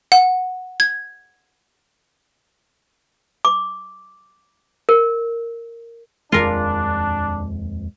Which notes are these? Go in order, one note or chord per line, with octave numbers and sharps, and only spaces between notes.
F#5
G#6
D6
A#4
D#1 F2 G#3 D4 F4 A#4